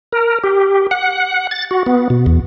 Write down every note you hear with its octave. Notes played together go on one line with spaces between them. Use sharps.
A#4
G4
F#5
A6
F#4
B3
B2
E2